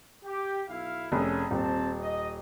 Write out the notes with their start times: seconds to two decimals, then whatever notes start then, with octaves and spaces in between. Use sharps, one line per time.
0.25 G4
0.70 B1 E4 F5
1.12 F1 C#4 G#4 A4
1.51 D#1 C4 A5
2.01 D#5